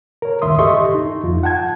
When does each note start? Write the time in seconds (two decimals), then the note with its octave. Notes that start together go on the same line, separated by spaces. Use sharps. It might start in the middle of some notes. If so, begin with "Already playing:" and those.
0.22 A#4 C#5
0.42 D2 G2 D#3 E5 C6 D#6
0.59 G4 A4 D#5 E5 C6 C#6
0.95 D#4
1.24 F2 F4
1.43 F#5 G5 A5 G#6